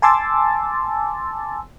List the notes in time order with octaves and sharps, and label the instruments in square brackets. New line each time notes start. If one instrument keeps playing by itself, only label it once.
[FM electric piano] G#5 A5 C6 D6 E6 A6